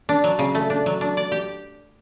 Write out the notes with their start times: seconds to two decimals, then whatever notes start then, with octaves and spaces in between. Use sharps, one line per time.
0.09 D4
0.24 F#3
0.39 C#3
0.55 A3
0.70 D4
0.86 F#3
1.01 D4
1.17 D5
1.32 G4